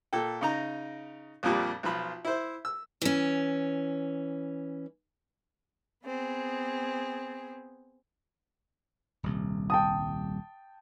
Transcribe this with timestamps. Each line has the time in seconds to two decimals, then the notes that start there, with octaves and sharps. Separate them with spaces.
0.13 A#2 A4 G5
0.41 C#3 D#4 A#5
1.43 A#1 F2 A#2 G3
1.83 B1 F3 F4 B5
2.25 E4 C5
2.65 E6
3.02 E3 C#4
6.04 B3 C4 G#4
9.23 D#1 C2
9.70 G5 A5 D#6